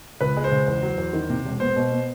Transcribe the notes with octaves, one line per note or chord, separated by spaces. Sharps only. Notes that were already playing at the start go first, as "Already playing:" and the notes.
C#2 B4
G#3
C5
C#2
E2
F#3
E2
D#3
C3
E1
B3 C5
B2
B3